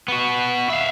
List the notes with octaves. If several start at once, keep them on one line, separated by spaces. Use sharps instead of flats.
B3 F#4
E5 F5